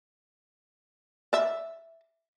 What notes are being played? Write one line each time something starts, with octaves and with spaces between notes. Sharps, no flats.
D5 E5